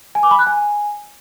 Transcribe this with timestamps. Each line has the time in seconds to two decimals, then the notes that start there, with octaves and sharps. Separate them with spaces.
0.15 G#5
0.23 D6
0.31 B5
0.39 F#6
0.47 G#5